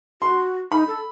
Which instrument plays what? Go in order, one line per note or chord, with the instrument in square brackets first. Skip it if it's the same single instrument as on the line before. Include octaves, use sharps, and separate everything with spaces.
[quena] F#4 [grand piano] C6
[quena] D#4 [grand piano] B5
[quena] A4